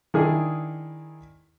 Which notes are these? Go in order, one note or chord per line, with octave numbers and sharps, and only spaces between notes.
D#3 D4 E4 G#4